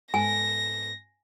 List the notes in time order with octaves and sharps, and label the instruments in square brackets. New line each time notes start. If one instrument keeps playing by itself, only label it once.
[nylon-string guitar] G#2 B3 A4 [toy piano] G#5 [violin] A#6